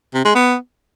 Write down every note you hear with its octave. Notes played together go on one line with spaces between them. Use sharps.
C3
G#3
B3